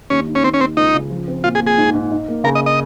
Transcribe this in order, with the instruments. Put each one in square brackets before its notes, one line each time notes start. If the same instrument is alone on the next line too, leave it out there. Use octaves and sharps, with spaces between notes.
[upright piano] D#2 [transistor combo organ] C#4
[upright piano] D#3
[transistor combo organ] C#4
[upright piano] D#3 [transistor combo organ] C4
[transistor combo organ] C#4
[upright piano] D#2 [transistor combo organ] C4
[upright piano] C#2 [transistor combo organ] D#4
[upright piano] C#3
F3
C4
[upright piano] A#2 [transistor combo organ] F4
[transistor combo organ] G#4
[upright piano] A#2
[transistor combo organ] G#4
[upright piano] G#2
G#2
D#4
A#3
[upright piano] C#3 [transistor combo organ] A#4
[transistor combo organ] D#5
D#5